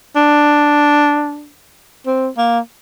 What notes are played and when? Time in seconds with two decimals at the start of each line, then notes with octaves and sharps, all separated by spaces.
0.16 D4
2.06 C4
2.37 A#3